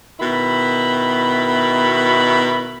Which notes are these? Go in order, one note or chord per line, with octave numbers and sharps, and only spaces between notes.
B2 D#3 E4 B5